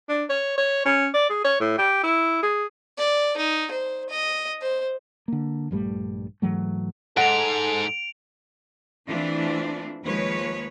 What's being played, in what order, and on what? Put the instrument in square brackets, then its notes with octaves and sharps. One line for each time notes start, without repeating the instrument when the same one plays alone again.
[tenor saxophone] D4
C#5
C#5
C#4
D5
G#4
C#5
A2
G4
E4
G#4
[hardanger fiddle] D5
D#4
C5
D#5
C5
[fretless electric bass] D3 A#3
A#1 G2 G3 A3
G#2 E3 F#3 A3
[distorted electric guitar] G#2 [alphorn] A4 [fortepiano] F#5 [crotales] D7 F7
[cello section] E3 A3 C4 D4 F4
D#2 F3 G#3 A#3 B4 C#5